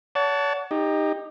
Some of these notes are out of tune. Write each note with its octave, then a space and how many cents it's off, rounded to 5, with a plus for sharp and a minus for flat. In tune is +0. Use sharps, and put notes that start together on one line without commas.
C#5 +40 F#5 +0 A5 +0
D#4 +0 G4 +25